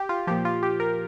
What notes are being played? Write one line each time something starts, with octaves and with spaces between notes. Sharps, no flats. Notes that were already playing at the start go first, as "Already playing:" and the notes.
Already playing: G4
F4
A#2 F3 G4
F4
G4
A#4